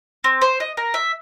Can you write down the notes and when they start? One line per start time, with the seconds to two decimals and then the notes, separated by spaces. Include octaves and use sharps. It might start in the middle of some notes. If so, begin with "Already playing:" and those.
0.24 C4
0.42 C5
0.60 D#5
0.77 A#4
0.94 E5